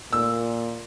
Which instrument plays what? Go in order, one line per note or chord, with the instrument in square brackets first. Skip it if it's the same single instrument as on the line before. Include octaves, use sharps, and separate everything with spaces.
[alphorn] A#2 [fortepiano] E6